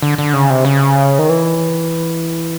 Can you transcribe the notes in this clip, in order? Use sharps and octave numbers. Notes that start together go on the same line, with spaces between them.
D3
D3
C#3
C3
C#3
D#3
E3